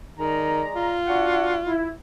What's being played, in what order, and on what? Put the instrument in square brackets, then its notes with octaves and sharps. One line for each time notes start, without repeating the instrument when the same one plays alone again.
[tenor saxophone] D#3 [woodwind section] G#3 D5 A#5
[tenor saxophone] F4
[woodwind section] D4 F#4 F#5
E4